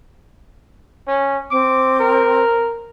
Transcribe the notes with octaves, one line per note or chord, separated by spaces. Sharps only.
C#4
C4 D6
A#4